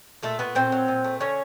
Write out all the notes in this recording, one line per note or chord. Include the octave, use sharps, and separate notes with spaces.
A#2 A3 A4
A3 B3 B4
A#2 C4 C5
F#3
A#2
A3
D3 C#4 C#5